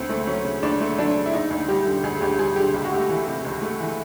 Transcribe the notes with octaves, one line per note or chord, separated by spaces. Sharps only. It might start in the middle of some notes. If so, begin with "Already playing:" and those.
Already playing: D2 C4
A3
F#3 C#4
C#3
D2 D4
A3
F#3 D4
C#3
E4
D2 D#4
D2
G3 G4
D3
D2 G#4
D2 G4
G3 G#4
D3 G4
C#2 G4
F#4
A3 G4
E3
C3
C#2
A3
E3